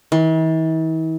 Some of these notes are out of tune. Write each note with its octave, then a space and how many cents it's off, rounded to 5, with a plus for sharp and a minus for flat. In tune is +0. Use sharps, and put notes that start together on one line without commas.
E3 -45